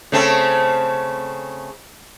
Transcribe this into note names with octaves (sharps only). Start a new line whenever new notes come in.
C#3 A3 C4